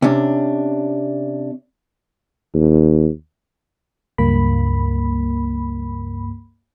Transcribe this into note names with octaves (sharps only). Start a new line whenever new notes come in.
C3 C#4 D4
D#2
C#2 G2 A#3 B5